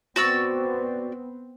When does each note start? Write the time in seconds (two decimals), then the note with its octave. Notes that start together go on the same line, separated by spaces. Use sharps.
0.16 B3 C4 F#4 D5 E6